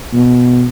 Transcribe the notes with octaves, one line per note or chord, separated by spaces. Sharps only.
B2